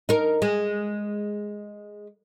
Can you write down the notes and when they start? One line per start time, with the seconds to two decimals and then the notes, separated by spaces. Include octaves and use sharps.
0.09 D#4 A#4
0.42 G#3